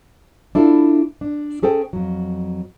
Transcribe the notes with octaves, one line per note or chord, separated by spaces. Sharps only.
D4 E4 F4 A4
D4
C#4 G#4 A4 C5 G5
F2 F#3